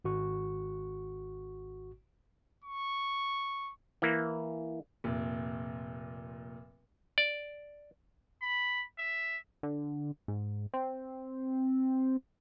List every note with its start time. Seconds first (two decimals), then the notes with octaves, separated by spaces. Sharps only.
0.05 G#1 F#4 C#6
2.64 C#6
4.02 E3 A#3
5.04 F1 A#2
7.18 D5
8.42 B5
8.98 E5
9.63 D3
10.28 G#2
10.74 C4